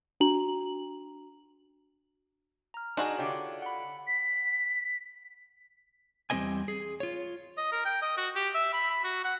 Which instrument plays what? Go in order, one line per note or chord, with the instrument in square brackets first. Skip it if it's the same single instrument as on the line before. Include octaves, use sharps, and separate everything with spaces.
[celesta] D4 F#4 A#5 F#7
[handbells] A#5 F6
[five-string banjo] D4 F#4 G#4 [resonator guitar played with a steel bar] D#4
[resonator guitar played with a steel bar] D3 F4 G4 [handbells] C#5
[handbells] F#5 B5
[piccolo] B6
[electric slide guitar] E2 G3 C4 B4 D#5 G#5
G#4
F4 C#5
[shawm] D#5
A#4
G5
D#5
F#4
G4
E5
B5
B5
F#4
F#5